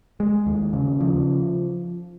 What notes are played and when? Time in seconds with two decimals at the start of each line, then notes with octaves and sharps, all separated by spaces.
0.20 G#3
0.46 D#2
0.73 C#3
1.01 F3